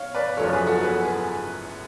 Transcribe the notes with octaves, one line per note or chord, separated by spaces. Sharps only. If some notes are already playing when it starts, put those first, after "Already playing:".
Already playing: C#5 F5
B4 D5
F#1 F#2 F3 A4 C#5
G#4 B4
F#4 A4
G#4 B4
G#4 B4